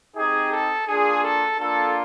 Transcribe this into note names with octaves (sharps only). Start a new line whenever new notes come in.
C4 D#4 G4 G#4
A4
A#3 D4 F4 G#4
A4
A#3 D4 F4 A4